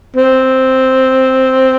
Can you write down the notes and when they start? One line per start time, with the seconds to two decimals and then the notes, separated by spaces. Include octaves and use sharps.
0.16 C4